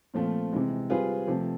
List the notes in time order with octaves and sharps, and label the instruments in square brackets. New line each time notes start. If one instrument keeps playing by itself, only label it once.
[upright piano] A#2 F3 A3 C4 F4
C3 E3 G#3
G3 C4 F4 G#4 B4
C3 F3 A3